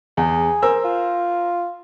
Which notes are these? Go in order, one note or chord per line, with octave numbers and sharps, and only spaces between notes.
E2 G#4
A#4 C5 E6
F4